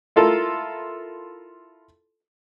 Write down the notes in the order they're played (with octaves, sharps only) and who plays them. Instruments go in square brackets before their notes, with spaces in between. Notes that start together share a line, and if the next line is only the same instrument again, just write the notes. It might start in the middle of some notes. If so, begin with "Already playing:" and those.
[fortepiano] E4 F4 A4 A#4